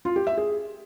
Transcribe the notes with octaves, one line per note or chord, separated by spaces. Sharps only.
F4
G4
E5
G#4